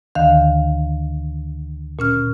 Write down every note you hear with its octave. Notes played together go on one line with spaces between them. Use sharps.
D2 D3 D#3 F5
A#2 C#4 F6